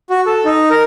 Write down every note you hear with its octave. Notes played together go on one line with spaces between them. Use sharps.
F#4
A4
D#4
A#4